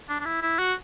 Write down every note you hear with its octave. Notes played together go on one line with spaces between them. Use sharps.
D4
D4
E4
E4
F#4